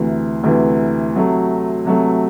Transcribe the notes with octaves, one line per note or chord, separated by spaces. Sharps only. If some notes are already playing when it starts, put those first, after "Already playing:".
Already playing: D2 C3 E3
D2 C3 E3
C3 F#3 A3
C3 F#3 A3